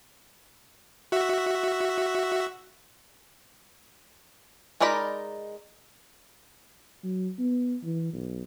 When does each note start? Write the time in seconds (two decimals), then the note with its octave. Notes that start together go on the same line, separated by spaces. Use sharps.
1.12 F#4 E5
4.80 G#3 D#4 A#4 D5 B5
7.03 F#3
7.39 B3
7.84 E3
8.13 B1